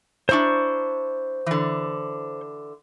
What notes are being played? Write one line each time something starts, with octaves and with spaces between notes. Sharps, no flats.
D4 E4 C5 A#5 C#6
D3 E3